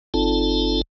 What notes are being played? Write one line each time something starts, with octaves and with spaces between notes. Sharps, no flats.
G1 C4 D#4 F4 A4 A5